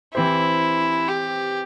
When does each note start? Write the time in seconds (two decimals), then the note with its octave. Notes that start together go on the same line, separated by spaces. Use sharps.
0.14 E3 C4 E4 G4 C5
1.08 G4